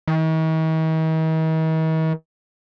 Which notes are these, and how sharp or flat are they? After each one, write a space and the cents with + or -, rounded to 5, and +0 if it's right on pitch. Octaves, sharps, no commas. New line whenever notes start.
D#3 +45